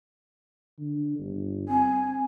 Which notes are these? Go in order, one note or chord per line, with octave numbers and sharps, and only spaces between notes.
D3
G1
C4 G#5